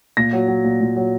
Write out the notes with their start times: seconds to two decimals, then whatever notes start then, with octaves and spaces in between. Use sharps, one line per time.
0.17 A#2 A#6
0.33 F#3
0.48 F#3
0.64 A#2
0.81 A#2
0.96 F#3